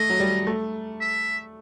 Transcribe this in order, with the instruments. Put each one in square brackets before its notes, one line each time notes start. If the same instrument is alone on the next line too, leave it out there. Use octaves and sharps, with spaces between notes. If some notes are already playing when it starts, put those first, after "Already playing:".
Already playing: [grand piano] A3 [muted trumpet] D#5
[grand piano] F#3
G3
A3
[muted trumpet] E5